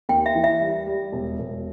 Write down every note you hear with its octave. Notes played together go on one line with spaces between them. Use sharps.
D#2 G5
E5
E3
E5
G3
G3
E1
E1